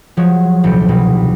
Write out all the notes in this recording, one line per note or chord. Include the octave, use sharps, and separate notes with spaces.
F3 F#3 G#3 C#5
D#1 C2 G5 C#7
C2 B2